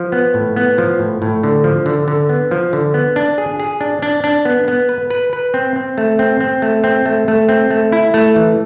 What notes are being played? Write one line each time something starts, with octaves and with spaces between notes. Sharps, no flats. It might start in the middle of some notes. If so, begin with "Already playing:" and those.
Already playing: F3
B3
A2
B3
F3
A2
A2
D3
F3
D3
D3
B3
F3
D3
B3
D4
G#4
G#4
D4
D4
D4
B3
B3
B4
B4
B4
C4
C4
A3
C4
C4
A3
C4
A3
A3
C4
A3
E4
A3
E3